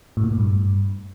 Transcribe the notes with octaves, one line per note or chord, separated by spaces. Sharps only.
A2
A#2
A2
G2